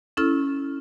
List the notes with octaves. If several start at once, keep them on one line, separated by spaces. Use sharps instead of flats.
C#4 E4 A4 F6